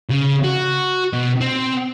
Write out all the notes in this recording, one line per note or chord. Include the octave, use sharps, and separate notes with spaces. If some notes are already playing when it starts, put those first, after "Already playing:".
C#3
F#4
B2
C4